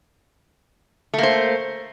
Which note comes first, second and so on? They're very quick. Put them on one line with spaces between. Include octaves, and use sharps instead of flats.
A3 A#3 C5